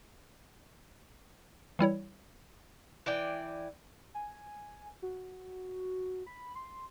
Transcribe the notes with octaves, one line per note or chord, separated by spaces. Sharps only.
E3 G3 E4 C#5
E3 D5 G5
G#5
F#4
B5
C6